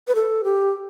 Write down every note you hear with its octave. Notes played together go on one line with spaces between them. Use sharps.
B4
A4
G4